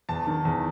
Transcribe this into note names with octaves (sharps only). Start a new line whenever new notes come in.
E2 A5
D#3
E2